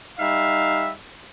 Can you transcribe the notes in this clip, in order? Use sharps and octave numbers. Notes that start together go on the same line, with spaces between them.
G3 D#4 E5 F5